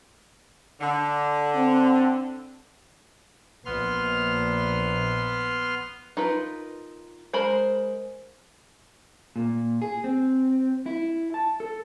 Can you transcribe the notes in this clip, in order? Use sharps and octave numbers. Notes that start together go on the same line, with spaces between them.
D3
C4
A#1 B3 C6 F6
D#4 F4 A#4 B4
G#3 A#4 C5 B5
A#2
G#4
C4
E4
A5
A4